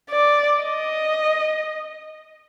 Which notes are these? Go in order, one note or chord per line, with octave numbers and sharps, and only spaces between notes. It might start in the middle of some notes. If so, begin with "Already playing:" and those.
D5
D#5